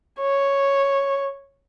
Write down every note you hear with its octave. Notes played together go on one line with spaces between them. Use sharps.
C#5